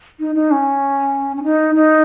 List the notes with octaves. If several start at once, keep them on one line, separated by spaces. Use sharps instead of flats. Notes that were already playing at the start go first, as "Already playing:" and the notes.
D#4
D#4
C#4
C#4
D#4
D#4